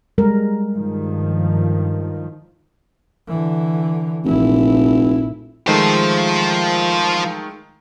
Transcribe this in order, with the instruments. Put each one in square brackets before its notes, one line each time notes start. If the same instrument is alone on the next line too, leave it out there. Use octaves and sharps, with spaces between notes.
[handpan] G3 G#3 A#4
[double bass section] G2 D#3 F3
[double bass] D3 E3
[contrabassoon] F1 [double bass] A#1 E4
[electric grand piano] D#3 G#3 A3 [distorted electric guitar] F3 C5